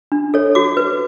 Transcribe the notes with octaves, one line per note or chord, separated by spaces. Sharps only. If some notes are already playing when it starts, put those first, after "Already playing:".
D4
A4 C#5
F#4 D6
B4